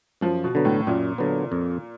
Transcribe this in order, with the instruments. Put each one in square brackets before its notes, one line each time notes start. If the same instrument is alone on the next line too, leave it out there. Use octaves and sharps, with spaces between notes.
[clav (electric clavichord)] F#2 [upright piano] F3
[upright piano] B2
[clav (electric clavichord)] D3 F#3 B3
[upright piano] A2
[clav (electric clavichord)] F#2 [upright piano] A#2
[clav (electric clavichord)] D3 F#3 B3
F2